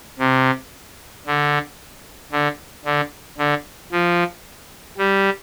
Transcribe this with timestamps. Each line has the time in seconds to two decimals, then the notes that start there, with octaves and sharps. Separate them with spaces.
0.19 C3
1.26 D3
2.32 D3
2.85 D3
3.38 D3
3.92 F3
4.98 G3